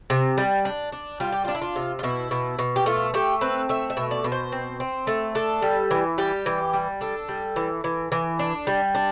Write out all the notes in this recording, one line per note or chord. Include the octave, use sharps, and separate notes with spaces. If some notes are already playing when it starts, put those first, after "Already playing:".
C3
G3
D4
D4
G3 F4
G4
D4 F4
E4
F4
C3
F4
B2 E4
B2
B2
G4
A3 F4
A3 G4
C4 B4
A3 E5
E5
B2
D5
B2
C5
C4
C4
A3
D4 A4
G3
E3
G3 G4
E3
G3
D4 A4
G3
E3
E3
E3
D4
G3
D4